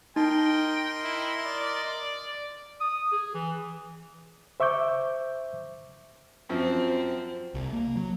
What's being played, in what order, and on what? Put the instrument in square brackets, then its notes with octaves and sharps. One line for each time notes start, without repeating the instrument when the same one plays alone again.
[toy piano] D#4 [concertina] A#4 D#5 C6 [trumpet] G5
[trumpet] E4
D5
[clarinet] D#6
G#4
E3
[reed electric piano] C5 E5 C#6 D6 G6
[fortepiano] F#2 F3 [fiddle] C4
[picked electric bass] C2
A#3
F#3